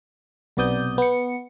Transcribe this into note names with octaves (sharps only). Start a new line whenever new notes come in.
B1 C3 B3 D5 D#6 G6
B3 C#7